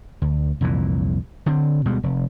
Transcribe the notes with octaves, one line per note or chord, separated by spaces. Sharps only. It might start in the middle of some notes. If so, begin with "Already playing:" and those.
D2
C2 F2 A#2 E3
D3 C4
D2 B2 G3 G#3
F1